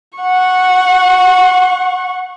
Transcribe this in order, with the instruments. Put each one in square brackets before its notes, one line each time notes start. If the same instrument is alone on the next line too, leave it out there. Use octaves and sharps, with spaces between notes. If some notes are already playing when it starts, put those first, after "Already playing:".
[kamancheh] F#5 C#6